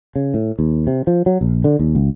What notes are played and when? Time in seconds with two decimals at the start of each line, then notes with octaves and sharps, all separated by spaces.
0.16 C#3
0.34 A2
0.59 D#2
0.87 C3
1.07 F3
1.26 F#3
1.41 A#1
1.64 D3
1.79 D#2
1.95 C#2